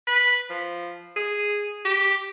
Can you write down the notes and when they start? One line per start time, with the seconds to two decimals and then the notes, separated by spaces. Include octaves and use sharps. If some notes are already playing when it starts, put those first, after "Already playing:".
0.07 B4
0.50 F3
1.16 G#4
1.85 G4